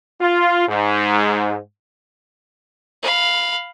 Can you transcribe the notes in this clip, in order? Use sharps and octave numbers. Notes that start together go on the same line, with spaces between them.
F4
G#2
F5 B5